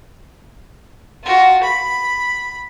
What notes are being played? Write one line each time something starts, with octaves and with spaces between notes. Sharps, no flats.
F4 F#4
B5